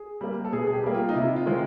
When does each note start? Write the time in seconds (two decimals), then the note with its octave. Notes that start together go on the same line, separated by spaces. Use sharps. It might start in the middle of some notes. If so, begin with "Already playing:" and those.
Already playing: G#4
0.21 G3 A#3
0.45 A4
0.52 B2 G#4
0.67 G#4
0.73 G4
0.83 G3 A#3
0.94 F4
1.09 D#4
1.15 C3 E4
1.36 F4
1.46 D#3 G#3 C4